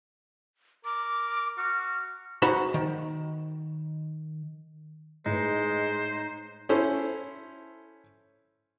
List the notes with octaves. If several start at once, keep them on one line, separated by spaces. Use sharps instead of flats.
A#4 D6
F#4 F6
D#4 F#4 C5 A5 B5
D#3
A2 G#3 D#4 B4 C5
C#4 E4 A4 C5